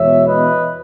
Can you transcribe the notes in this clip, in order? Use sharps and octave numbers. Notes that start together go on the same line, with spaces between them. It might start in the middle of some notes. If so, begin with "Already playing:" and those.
Already playing: E2 B2 G#3 C#5 E5
B4 D#5